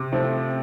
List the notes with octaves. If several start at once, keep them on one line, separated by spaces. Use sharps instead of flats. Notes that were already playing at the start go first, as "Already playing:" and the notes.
Already playing: C3
F3 A3 C4